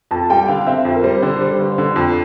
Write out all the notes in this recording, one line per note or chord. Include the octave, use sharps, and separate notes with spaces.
F2 A5
G3 G5
D3 F5
C4 E5
F2
A#4
G3 C5
D3 C5
G3
G1
D3
F2